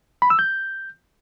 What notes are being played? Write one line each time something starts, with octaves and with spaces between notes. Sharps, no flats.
B5
E6
G6